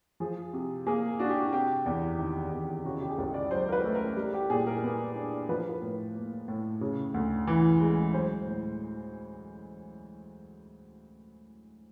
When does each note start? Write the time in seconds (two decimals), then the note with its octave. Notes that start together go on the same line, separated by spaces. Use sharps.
0.20 F3 G#4
0.53 C3
0.87 A#3 G#4
1.19 D4 F#4
1.29 G4
1.38 F#4
1.53 C3 G4
1.86 E2
2.19 D#3
2.52 E2
2.85 C#3 F#4
3.01 G4
3.10 G#4
3.18 C#2 A4
3.34 D5
3.51 F#3 C5
3.68 A#4
3.72 B4
3.84 A3
3.95 A#4
4.17 G3
4.33 G4
4.50 A#2 G#4
4.67 A#4
4.83 B3
5.16 D4
5.49 F3 B4
5.60 A#4
5.69 B4
5.82 A2
6.15 A#3
6.48 A2
6.81 C#3
7.14 D2
7.47 E3
7.81 G#3
8.13 F#3 C5
8.46 A2